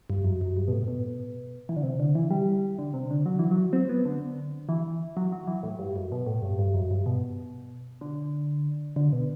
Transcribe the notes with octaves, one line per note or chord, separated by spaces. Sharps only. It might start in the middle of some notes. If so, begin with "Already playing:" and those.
G2
F#2
F#2
G2
B2
A2
B2
E3
D3
C3
D3
E3
G3
D3
C3
D3
F#3
E3
F#3
C4
B3
D3
E3
F#3
F#3
E3
A2
G2
F#2
B2
A2
G2
G2
F#2
G2
B2
D3
D3
B2